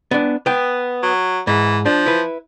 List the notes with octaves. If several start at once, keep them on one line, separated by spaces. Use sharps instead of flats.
B3 D4
B3 G5
F#3
G#2 E3
F3 D4
E4 B4